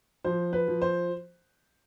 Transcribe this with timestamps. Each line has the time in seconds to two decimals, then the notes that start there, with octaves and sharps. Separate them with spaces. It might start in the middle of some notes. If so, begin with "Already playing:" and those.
0.24 F3 C5
0.53 B4
0.68 F3
0.82 C5